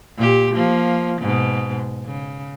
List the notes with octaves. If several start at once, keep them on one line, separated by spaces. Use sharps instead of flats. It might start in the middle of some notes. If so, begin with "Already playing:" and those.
A#2 G4
F3 A#3
G#2 B2
C#3